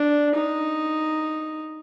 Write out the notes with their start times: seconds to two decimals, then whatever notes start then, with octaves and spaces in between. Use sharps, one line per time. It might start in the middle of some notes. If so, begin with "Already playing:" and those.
Already playing: D4
0.35 D#4